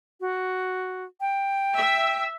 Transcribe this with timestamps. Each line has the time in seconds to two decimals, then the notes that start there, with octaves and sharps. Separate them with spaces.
0.20 F#4
1.21 G5
1.77 E5